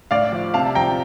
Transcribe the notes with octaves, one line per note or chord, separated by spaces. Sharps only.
A2 D5 F5
F3
C3 F5 A5
F3 G5 A#5